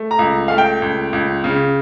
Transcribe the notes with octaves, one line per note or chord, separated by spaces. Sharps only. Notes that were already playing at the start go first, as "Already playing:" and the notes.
Already playing: A3
A#5
C#2
A3 F5
G5
C#2
C#2
C#3